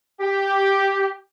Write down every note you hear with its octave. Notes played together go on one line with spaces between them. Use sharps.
G4